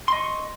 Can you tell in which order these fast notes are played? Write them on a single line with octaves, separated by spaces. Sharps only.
C6 D#5 C#6